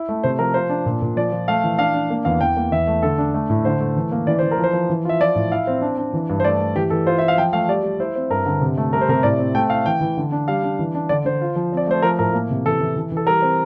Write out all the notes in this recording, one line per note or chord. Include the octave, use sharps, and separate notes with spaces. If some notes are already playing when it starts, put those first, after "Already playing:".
Already playing: E4
A3
C3 C5
F3 A#4
F4 C5
D4
A#2
A#2
F3 D5
F3
A3 F5
E3
D4 F5
D4
A#3
E2 F5
E2 G5
A#3
E2 E5
A3
D3 A4
D4
A3
A2
D3 C5
A3
E3
A#3
E3 D5
E3 C5
A#4
F3
C5
F3
E3
F4 E5
F3 D5
A2
E4 F5
C4
D4
D4
E3
G2
C5
A3 D5
A3
E3 G4
E3 A4
F4 C5
F4 E5
F5
F3 G5
A3 F5
G3 D5
G3
E4 C5
C4
G2 A#4
D3
C3
A3
G3 A#4
C5
C3 A#4
A2 D5
C4
A3 G5
E4 F5
E3 G5
E3
D3
D4
G3 F5
D4
E3
D4
D3 D5
D3 C5
F4
F3
C4 D5
A3 C5
F3 A#4
A2 A#4
A#3
C3
E3 A4
E3
E3
E3 A4
G3 A#4
C4